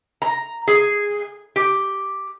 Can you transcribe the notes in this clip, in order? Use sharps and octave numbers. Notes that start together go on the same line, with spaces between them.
A#5
G#4
G4